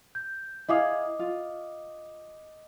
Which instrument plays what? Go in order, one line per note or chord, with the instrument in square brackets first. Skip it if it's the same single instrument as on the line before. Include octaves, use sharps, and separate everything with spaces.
[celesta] G6
[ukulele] E4 G#4 F5 [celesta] D#5 D6 D#6
[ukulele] F4